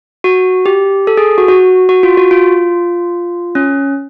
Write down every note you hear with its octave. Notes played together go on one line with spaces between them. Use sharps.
F#4
G4
A4
G#4
F#4
F#4
F#4
F4
F#4
F4
C#4